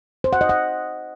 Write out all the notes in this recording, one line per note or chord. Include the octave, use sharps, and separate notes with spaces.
C5
F#5
D#5
F#5